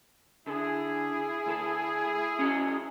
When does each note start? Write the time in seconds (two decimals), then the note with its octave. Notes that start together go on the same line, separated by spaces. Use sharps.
0.47 D3 E4 G#4
1.46 D2 A4
2.39 C#4 F#4 D#5